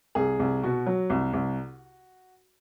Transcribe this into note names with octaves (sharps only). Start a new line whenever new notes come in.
C2 G#4
C2
B2 F#4
F#3
C2
C2